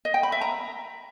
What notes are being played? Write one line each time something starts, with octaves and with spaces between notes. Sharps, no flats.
D#5
G5
B5
E5
A#5